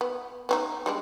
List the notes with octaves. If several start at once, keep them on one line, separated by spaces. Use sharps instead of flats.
B3
B3 C4 D#4
G3 G#3 D4